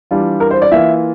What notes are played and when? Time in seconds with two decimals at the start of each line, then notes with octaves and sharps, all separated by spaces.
0.11 E3 G3 D4 F4
0.40 A#4
0.51 C5
0.62 D5
0.71 E3 A#3 F4 E5